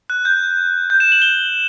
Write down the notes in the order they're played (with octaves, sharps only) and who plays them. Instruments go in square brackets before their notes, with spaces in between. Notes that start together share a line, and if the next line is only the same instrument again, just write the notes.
[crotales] F#6
G6
G6
E7
F#7
G7